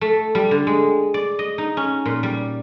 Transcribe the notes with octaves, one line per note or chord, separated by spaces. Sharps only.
A3
G3
D3
G#3
D5
D#5
D#4
C#4
A#2
G3